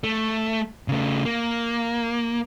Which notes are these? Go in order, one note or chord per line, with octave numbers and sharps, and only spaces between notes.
A3
C#3 A3
A#3